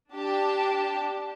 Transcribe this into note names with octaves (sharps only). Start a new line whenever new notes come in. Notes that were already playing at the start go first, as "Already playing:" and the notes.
D4 G4 A5